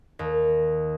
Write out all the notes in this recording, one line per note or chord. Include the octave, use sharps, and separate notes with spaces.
D#2